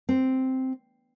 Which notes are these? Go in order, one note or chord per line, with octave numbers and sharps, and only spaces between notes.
C4